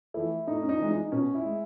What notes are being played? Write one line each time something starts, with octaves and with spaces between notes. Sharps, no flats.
E3 A3 E4
A2 D#4
C#4
D#4
E3 G#3
D#4
B2 C#4
E4
G#3